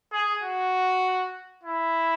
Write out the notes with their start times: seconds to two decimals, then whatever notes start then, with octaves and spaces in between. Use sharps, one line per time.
0.12 G#4
0.43 F#4
1.63 E4